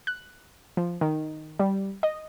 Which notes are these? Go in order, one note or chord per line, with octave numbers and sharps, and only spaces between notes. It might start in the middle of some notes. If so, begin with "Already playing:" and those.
F#6
F3
D#3
G3
D#5